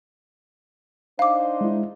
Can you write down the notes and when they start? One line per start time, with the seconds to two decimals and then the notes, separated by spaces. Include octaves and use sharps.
1.19 D4 D#4 C5 F5 D6
1.61 G#3 E4